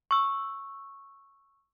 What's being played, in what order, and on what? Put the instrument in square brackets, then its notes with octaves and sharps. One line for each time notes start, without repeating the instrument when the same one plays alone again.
[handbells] C#6 E6